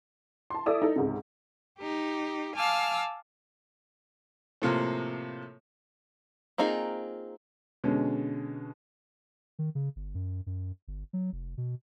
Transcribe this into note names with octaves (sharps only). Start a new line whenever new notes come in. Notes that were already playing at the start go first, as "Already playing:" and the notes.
A5 C6
E4 A4 D5 D#6 E6
D#4 A4
C#2 G#2 C3
D#4 G4
F5 G#5 A5 D6 E6 F6
A2 C3 F3 A#3
A#3 C4 D#4 F4 G#4
B2 D3 G#3 C#4
D#3
C#3
G1
F#2
F#2
G1
F#3
F1
B2